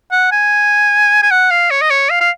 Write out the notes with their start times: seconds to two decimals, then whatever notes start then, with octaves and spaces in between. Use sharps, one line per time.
0.12 F#5
0.32 G#5
1.22 G#5
1.31 F#5
1.51 F5
1.71 C#5
1.82 D#5
1.90 C#5
2.10 F5
2.21 F5